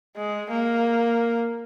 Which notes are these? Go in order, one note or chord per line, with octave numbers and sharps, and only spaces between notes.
G#3
A#3